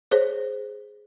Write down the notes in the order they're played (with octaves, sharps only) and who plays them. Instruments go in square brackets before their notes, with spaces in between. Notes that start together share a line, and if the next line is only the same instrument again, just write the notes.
[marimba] G#4 C5 C#5